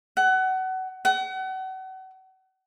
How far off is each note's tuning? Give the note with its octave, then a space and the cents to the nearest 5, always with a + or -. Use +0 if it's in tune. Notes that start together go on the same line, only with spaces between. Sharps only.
F#5 +25
F#5 +35